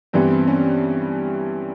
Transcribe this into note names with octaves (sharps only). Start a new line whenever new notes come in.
G2 E3 G3 B3 C4
C4
C#4